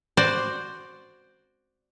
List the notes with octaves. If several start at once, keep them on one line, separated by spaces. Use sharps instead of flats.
F#4 C5 D5